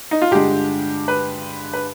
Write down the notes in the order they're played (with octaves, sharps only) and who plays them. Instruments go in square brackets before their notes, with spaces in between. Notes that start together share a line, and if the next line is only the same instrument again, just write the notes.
[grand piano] D#4
F4
G2 D3 G#3 G4
B4
B4